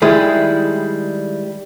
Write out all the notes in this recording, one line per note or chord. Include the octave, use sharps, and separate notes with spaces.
D#3 G3 G#3 E4 G#4